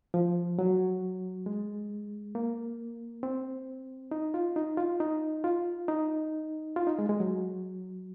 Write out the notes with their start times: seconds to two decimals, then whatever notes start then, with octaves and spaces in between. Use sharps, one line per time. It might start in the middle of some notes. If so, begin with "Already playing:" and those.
0.14 F3
0.59 F#3
1.46 G#3
2.35 A#3
3.23 C4
4.11 D#4
4.34 F4
4.56 D#4
4.77 F4
5.00 D#4
5.44 F4
5.88 D#4
6.76 F4
6.87 D#4
6.99 G#3
7.09 G#3
7.20 F#3